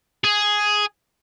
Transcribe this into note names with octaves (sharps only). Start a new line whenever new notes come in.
G#4